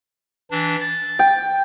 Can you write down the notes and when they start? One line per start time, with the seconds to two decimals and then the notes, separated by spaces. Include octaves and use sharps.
0.51 E3 D4
0.80 A6
1.19 G5